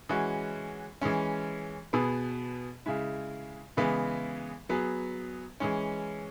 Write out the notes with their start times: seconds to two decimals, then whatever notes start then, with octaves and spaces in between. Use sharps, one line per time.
0.09 E3 G#3 C#4 F#4
1.01 E3 G#3 C#4
1.93 B2 B3 G#4
2.86 C#3 G#3 E4
3.77 C#3 E3 G#3 B3
4.69 F#3 B3 G#4
5.60 E3 G#3 C#4